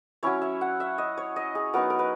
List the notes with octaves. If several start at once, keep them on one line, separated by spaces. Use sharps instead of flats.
F#3 C#4 E4 C#5
E5
F#5
E5
D#5
C#5
D#5
G#4
F#3 B3 D#4 A#4
A#4
B4